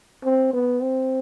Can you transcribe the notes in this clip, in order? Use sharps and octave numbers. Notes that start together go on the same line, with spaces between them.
C4
B3
C4